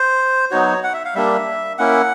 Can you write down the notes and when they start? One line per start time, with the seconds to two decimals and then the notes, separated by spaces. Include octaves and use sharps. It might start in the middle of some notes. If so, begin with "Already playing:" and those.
Already playing: C5
0.51 F#3 B3 D#4 F#4 C#5
0.84 F#5
0.93 E5
1.05 F5
1.15 G3 A#3 D4 E5
1.78 A#3 C#4 E4 F#5